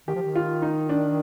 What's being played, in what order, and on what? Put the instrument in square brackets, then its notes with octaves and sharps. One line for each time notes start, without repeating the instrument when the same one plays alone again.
[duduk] D#3 [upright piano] G4
[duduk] F3
D#3
[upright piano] F4
D#4
D4